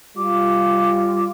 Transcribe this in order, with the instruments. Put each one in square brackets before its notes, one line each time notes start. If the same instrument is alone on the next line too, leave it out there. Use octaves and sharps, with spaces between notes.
[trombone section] G3 F4 [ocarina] D6